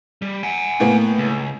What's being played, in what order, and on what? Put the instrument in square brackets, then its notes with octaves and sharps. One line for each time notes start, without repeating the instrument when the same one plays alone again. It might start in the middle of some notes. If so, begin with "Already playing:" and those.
[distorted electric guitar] G3
F#5 G#5
[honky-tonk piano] A2 A#3 B3
[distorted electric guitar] C#2